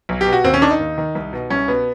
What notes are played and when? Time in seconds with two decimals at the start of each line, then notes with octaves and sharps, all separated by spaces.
0.09 B1
0.21 G4
0.26 B2
0.33 F#4
0.44 D#2 C4
0.54 C#4
0.62 D#3 D4
0.70 D#4
0.79 D#2
0.98 D#3
1.15 C2
1.33 B2
1.50 C2 C#4
1.68 B2 B3